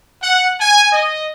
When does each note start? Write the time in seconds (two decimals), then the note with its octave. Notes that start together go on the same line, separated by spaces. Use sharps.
0.23 F#5
0.61 G#5
0.92 D#5